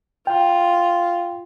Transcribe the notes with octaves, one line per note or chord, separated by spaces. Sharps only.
F4 G5